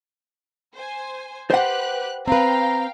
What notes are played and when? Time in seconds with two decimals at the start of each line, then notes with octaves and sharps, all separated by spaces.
0.75 C5 G#5
1.50 G4 B4 C5 F#5 F#6
2.28 C4 B4 F5 G5 A#5